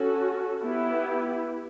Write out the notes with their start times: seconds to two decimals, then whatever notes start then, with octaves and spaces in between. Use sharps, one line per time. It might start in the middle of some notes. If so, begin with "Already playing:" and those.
Already playing: C#4 F#4 A4
0.61 B3 E4 G4